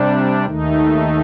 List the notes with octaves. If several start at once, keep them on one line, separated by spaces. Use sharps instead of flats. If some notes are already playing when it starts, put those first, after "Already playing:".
Already playing: C3 G3 D4
D#2 D#3 A3 D#4